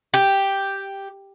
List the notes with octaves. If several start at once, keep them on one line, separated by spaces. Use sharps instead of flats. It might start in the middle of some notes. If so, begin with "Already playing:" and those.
G4